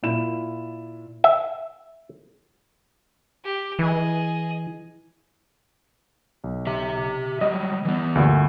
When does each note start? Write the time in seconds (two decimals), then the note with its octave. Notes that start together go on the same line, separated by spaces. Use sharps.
0.03 A#2 E4 E7
1.24 E5
3.44 G4
3.79 E3 G#4 D#5
6.44 B1
6.67 G4 E5
7.41 F#3 G3 D#5
7.85 E3 B3
8.15 D2 G2 A#2